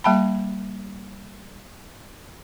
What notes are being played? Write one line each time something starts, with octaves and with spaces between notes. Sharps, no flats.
G3 A#3 G5 A5 B5